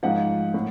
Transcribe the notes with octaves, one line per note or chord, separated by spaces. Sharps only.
G#2 F3 F#5
A2